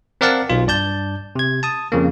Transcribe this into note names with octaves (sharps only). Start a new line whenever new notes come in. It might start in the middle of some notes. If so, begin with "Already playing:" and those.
C4 A#4 D5 F5 F#5 A5
B1 F4
G2 D5 A5 G6
C3 G#6
A5 D#6
F2 C#3 A#3